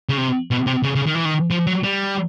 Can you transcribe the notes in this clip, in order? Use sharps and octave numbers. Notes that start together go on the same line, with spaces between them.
C#3
C3
B2
C3
C#3
C#3
D#3
E3
D#3
F3
F#3
G3